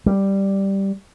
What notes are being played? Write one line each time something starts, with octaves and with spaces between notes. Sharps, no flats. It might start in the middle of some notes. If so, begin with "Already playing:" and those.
G3